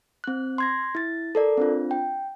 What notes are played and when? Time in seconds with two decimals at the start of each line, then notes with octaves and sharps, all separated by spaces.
0.24 C4 F#6
0.58 C6 G#6 A#6
0.95 E4 A6
1.35 A4 A#4 D5
1.57 C4 D4 F4
1.91 G5